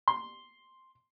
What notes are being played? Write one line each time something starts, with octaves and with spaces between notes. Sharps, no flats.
C6